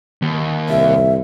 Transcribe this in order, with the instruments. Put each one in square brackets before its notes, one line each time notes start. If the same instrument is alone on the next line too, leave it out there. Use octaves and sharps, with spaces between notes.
[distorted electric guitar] D#2
[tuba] C2 [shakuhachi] E5